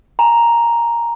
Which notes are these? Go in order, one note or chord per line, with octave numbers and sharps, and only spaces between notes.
G#5 A#5